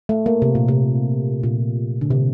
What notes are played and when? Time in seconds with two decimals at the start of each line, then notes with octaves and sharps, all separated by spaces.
0.09 A3
0.26 A#3
0.42 C3
0.55 A#2
0.68 C3
1.43 A#2
2.01 D3
2.11 C3